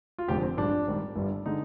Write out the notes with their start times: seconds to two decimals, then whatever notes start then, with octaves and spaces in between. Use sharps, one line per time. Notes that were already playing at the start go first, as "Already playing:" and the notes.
0.18 F4
0.28 F1 F2 D3 G#3 G4
0.43 C4
0.57 G#1 G2 F3 G#3 D4
0.87 G#1 G#2 D#3 G3
1.16 G1 G2 D3 G3
1.46 D3 G#3 D#4